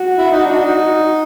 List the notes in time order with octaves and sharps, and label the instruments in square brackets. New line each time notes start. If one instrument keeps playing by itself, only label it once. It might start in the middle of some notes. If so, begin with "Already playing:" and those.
Already playing: [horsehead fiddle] F#4
[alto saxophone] E4
D#4
D4
D#4